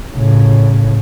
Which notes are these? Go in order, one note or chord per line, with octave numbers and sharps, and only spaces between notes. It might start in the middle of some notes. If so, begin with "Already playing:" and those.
A2 C#3